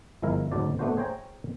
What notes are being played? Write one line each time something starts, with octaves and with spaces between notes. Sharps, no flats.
G1 F3 G#3 E4 A#4
D2 G#2 F#3 D4 C5 D5
A3 B3 D4 F#4 C5
G#4 C5 C#5 G5 A#5